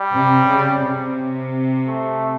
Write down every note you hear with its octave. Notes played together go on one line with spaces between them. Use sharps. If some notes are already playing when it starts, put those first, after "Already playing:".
Already playing: G3
C3
C#3
C3
A3